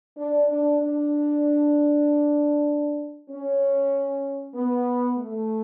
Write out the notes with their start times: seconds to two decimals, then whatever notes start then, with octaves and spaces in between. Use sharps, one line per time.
0.16 D4
0.48 D4
0.79 D4
3.30 C#4
4.55 B3
5.18 A3